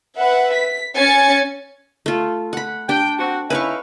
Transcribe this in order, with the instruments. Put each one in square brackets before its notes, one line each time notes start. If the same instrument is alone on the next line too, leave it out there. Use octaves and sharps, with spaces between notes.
[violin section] B4 E5 F#5
B6
C#4 G#5 A6 C#7
[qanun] A3 F4
F#5 B5
[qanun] D4 [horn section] G5
[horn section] C4 F#4
[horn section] C#4 D#4 E4 [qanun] B4 F5 C#6